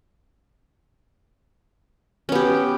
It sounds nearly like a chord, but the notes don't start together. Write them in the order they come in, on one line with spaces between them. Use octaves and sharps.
C#4 B3 G4